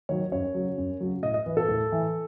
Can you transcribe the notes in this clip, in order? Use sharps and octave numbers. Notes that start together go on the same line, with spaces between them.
D#3 F#3 C#5
F#2 C#5
C#3 F#3
F#2
C#3 F#3
A2 D#5
D#5
E3 B4
A4
A2
E3